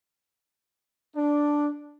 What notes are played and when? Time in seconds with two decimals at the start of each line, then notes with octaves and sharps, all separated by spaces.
1.16 D4